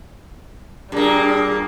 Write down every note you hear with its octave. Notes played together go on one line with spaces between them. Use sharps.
A#2 G3 A#3 D4 G#4